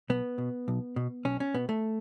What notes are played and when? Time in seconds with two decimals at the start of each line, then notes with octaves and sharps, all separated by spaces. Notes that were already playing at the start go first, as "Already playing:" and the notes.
0.10 B1 B3
0.38 B2
0.68 B1
0.96 B2
1.25 B1 C#4
1.40 C#4
1.54 B2 B3
1.69 A3